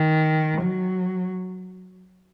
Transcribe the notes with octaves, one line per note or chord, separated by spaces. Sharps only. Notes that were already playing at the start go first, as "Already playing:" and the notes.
Already playing: D#3
F#3